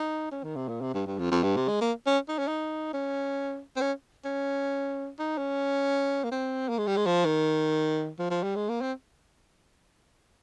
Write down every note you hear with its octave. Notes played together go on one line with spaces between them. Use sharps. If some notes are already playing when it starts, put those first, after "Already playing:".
Already playing: D#4
C#4
D#3
C3
A#2
C3
G2
G2
F2
F2
G2
C3
G#3
A#3
C#4
D#4
C#4
D#4
C#4
C4
C#4
C#4
D#4
C#4
A#3
C4
A#3
G#3
G3
G#3
F3
D#3
F3
F3
G3
G#3
A#3
C4